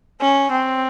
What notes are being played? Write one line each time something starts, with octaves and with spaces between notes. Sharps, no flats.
C#4
C4